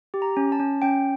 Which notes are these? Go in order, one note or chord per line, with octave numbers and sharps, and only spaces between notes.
G4
A#5
C#4
A5
C#4
C#4 G5